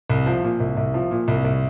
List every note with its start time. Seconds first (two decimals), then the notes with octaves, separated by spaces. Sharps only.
0.10 C2
0.26 F3
0.43 A#2
0.60 C2
0.77 C2
0.94 F3
1.11 A#2
1.28 C2
1.45 C2